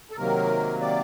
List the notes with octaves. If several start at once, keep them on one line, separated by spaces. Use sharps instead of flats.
A4
C3 D#3 F#3 A#3 A#4
D5